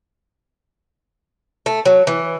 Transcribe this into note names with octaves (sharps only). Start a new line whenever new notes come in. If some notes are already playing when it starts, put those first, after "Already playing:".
A3
F#3
E3